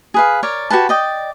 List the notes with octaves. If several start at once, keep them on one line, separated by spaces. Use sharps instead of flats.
G#4 B4 F5
A#4 C#5 D5
F#4 G4 B4 A5
D5 D#5 G5